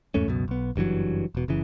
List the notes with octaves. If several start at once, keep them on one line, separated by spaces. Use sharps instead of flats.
E2 G#2 A3 C#4
C#2 F#2 B2
B1 B3
F#1 G2 E3 F#3
E1 B2
F#1 C#3 E3